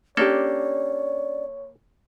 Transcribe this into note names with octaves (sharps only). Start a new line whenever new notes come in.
A#3 C#4 D4 G4 A4 C#5 D5